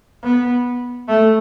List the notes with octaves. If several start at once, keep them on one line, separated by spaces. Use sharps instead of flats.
B3
A3